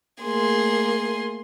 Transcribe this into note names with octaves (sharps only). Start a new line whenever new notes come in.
A3 A#3 G#4 C6